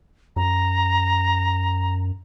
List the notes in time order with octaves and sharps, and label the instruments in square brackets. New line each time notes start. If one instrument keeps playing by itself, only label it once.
[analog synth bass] F#2 [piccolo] A#5